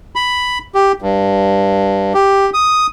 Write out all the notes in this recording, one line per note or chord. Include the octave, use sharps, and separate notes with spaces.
B5
G4
G2
G4
D#6